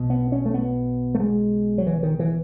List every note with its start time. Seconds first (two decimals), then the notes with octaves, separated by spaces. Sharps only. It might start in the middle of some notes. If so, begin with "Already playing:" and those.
Already playing: B1 B2
0.10 B3
0.32 C#4
0.46 A3
0.54 B3
1.15 A3
1.20 G#3
1.78 F#3
1.86 E3
2.03 D#3
2.19 E3